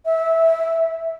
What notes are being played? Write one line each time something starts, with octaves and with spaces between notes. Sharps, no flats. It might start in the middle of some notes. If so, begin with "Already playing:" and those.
E5